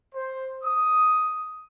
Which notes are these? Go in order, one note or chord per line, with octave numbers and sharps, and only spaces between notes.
C5
D#6